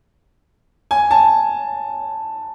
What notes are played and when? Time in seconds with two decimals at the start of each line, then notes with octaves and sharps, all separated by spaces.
0.91 G#5
1.11 A5